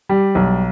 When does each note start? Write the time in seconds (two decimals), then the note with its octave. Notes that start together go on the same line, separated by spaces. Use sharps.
0.09 G3
0.35 B1